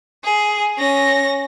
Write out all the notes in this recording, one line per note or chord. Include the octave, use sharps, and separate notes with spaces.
G#4
C#4 A#6